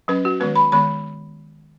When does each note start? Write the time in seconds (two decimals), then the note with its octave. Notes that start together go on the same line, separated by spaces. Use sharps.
0.08 F#3 C#4 B4
0.25 F#4
0.40 D#3 G#3 B3 B4
0.56 B5
0.72 D#3 G#3 B3 B5